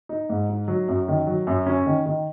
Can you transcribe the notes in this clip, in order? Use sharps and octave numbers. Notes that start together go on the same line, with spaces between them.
D#4
G#2
D#4
F#3
F#2
D#3
F#3
F#2
C#4
D#3
D#3